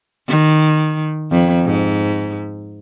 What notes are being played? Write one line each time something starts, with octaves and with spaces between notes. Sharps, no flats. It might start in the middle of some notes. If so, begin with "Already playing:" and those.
D#3
F2
G#2